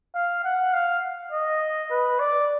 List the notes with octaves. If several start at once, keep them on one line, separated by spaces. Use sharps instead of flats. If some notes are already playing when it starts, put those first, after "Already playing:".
F5
F#5
F5
D#5
B4
D5